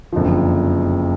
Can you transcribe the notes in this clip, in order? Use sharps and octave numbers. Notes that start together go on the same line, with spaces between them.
F#1 F2 D3 F3